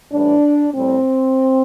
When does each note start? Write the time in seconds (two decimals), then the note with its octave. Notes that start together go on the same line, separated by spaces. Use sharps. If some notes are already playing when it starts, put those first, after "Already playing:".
0.11 A2 E3 G3 D4
0.74 A2 G3 C4